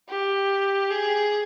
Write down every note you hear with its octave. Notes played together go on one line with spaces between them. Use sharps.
G4
G#4